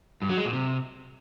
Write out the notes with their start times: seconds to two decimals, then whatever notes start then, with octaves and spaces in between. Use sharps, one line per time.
0.22 G2
0.29 F#3
0.37 G#3
0.45 A#2
0.53 C3